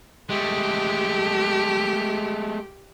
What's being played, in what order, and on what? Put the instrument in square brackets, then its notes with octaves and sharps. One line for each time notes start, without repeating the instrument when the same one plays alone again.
[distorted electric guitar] G#3 A3 [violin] G4